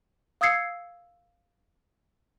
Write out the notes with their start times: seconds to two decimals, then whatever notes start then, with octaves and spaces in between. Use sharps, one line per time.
0.41 F5 D#6 E6 G#6 C7 C#7